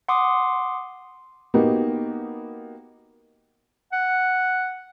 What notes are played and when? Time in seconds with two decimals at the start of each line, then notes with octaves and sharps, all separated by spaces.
0.08 F#5 C6 D6 D#6
1.54 A#3 B3 D#4 F#4 G4
3.92 F#5